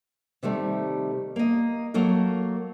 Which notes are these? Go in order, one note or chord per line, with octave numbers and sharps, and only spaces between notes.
C3 D#3 G3 A3
A#3 D#5
F#3 A3 A#3 A#4